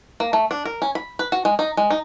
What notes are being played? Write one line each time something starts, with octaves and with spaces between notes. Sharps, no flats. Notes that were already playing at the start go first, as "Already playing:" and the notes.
A#3
A3
D4
A#4
C#4
B5
B4
F#4
G#3
D#4
G#3
D#4